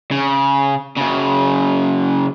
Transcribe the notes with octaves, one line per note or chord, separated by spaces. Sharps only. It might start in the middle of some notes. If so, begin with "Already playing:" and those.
C#3
F#2 C#3